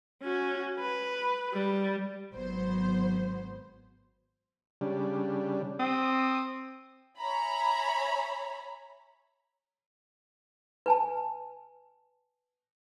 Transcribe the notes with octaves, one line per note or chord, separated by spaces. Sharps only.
C#4 F#4
B4
G3
G#1 F#3 B3 C5
C#3 G3 D4
C4 D#6
C#5 E5 G#5 A#5 B5
B4 G#5 A5